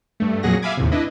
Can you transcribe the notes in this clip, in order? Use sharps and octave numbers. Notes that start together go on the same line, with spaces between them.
G2 A3
F2 A#2 F#3 G#4 F#5 A#6
E5 F5 G#5 B5 D6 G#6
D#2 A2 C3
D4 E4 B4 D#5